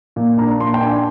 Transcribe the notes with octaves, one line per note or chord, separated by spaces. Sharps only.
A#2
D4 A#5
A#2 C6
G5
D4 G#5